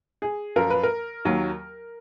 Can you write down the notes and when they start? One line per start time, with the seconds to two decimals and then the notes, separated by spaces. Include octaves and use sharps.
0.22 G#4
0.56 F#2 F3 A#4
0.70 B4
0.83 A#4
1.25 D#2 D#3 F#3